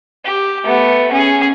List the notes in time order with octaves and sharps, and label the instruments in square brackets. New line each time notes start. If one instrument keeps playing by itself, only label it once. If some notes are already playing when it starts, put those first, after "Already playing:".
[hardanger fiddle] G4
A3 B3
C#4 G#4